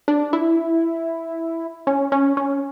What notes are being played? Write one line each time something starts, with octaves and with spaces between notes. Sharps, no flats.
D4
E4
C#4
C#4
C#4